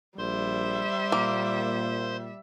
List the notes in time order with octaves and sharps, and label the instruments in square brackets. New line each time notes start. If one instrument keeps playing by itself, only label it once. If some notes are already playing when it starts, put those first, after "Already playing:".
[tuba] A#1 [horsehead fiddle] G3 E5 [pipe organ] C5 C6
[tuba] A#2 [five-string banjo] A#3